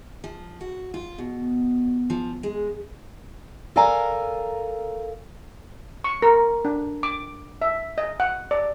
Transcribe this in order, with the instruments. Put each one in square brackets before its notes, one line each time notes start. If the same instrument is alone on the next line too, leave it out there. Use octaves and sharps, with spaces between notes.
[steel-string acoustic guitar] F3
F#4
F4
B2
F3
G#3
A4 A#4 D5 F5 G#5 A#5
[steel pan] C#6
A#4
D4
D6
E5
D#5
F#5
D5